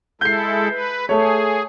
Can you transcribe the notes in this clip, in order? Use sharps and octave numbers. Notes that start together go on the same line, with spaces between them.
G#3 E4 A4 G6 C7
B4
A3 G#4 C#5